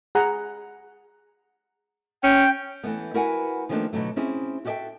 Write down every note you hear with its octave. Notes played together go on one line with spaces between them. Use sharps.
G#4 F#5 A#5
C#4 G5
E3 A3 B3
E4 F#4 A#4 B4 F#5 G#5
D#3 F3 A3 A#3 C#4 D4
B2 D3 F#3 A3
C4 C#4 E4 G#4
F#4 G4 A4 D5 E5 G5